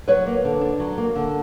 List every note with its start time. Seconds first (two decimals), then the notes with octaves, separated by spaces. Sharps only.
0.08 F#3 B4 C#5
0.26 A#3
0.44 D3
0.61 D4
0.80 F#3
0.98 A#3
1.15 D3